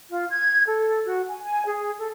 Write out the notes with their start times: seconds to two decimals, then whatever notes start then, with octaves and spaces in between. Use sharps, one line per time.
0.10 F4
0.31 G#6
0.67 A4
1.06 F#4
1.28 G#5
1.43 G#5
1.65 G#4
1.98 A4